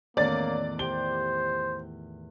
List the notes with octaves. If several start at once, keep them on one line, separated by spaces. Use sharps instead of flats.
E2 A2 D#3 A#3 C#4 D5 A6
G4 C5 G5 G7